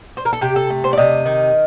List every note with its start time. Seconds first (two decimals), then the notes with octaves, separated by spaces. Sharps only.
0.17 C5
0.25 A#4
0.33 A4
0.41 C3 G4
0.56 A4
0.70 A3
0.84 C5
0.93 D5
0.98 C3 D#5
1.25 D#3